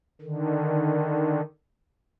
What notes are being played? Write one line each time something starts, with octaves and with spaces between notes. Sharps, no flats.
D3 D#3